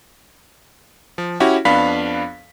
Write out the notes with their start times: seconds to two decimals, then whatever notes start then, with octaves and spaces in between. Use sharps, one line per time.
1.18 F3
1.40 C#4 E4 F#4 G4
1.65 F2 B3 D4 F5 B5 B6